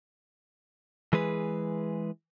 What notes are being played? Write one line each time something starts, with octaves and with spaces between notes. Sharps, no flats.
E3 G#3 G#4 B4